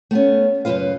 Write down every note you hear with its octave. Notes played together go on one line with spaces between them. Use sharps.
A3 B3 C#4
F#2 C#3 G#3 F4 B4 F5